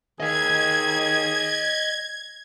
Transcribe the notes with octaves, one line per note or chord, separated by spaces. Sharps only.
D#3 G#4 D#5 F5 G#6